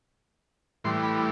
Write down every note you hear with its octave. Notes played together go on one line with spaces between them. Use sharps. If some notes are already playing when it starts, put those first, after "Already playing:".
A2 E3 G3 C6
B5